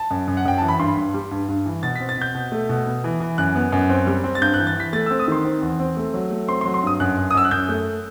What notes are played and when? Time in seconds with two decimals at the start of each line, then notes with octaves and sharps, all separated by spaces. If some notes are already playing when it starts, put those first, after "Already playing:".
Already playing: A5
0.11 F#2
0.28 F#2
0.37 F#5
0.45 F#2 G5
0.58 E3 A5
0.68 B5
0.79 G2 C6
0.97 G2
1.14 G3
1.31 G2
1.48 G2
1.66 E3
1.83 B2 A6
1.96 B6
2.00 C4
2.09 A6
2.17 B2 G6
2.35 B2
2.52 A3
2.69 B2
2.86 B3
3.04 E3
3.20 E3
3.38 F#2 F#6
3.55 B3
3.72 F#2
3.90 C4
4.07 G3
4.24 C4
4.35 A6
4.42 G2 G6
4.54 F#6
4.59 E3
4.67 A6
4.76 E3 B6
4.93 A3 A6
5.06 E6
5.11 C4
5.19 D#6
5.28 D#3 C6
5.45 C4
5.62 E2
5.80 C4
5.97 A3
6.14 F#3
6.30 A3
6.48 C4 C6
6.61 C6
6.65 F#3
6.74 C6
6.83 G2 D#6
7.00 F#2 F#6
7.17 F#2
7.31 D#6
7.34 F#2 E6
7.45 F#6
7.51 F#2 G6
7.69 A3